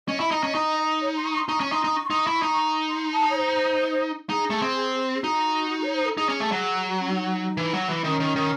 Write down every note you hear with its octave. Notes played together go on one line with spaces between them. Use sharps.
C#4 D#5
E4 E5
D#4 D#5
C#4
D#4
C#5
C6
C#6
C6
D#4 C#6
C#4
D#4 C6
D#4
C#6
D#4 C6
C#6
E4
D#4
C6
A5
C#5
C5
D#4 G#4
A3
C4
G#4
D#4 F#4
C#5
C5
A4
D#4 G#4
C#4
A3
F#3
C#4
D#4
E3
F#3
E3
D#3 C#4
D#3
D#3